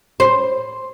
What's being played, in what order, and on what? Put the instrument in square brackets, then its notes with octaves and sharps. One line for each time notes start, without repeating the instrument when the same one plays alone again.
[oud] C5